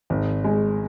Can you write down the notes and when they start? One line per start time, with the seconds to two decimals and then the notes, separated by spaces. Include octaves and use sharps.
0.10 G#1
0.44 G#3